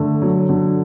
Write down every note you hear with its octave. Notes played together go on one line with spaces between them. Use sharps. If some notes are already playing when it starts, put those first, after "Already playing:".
Already playing: D3 A3
F#3
D3